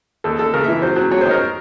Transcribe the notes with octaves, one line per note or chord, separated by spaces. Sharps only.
D#2 A4
D#2 A4
C#3 A#4
E3 E5
F#3 C5
F#3
F#3 C#5
D#3 C5
A#4